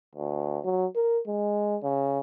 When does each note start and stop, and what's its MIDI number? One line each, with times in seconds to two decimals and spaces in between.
0.15 0.59 38
0.64 0.86 54
0.95 1.20 70
1.27 1.77 56
1.83 2.19 49